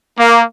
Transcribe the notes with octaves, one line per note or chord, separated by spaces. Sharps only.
A#3